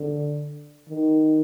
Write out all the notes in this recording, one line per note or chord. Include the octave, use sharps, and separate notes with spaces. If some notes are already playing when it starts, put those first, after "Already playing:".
Already playing: D3
D#3